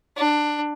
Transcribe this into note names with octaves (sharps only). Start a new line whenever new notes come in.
D4